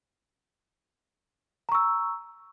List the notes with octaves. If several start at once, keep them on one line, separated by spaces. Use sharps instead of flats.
A#5 C#6 E6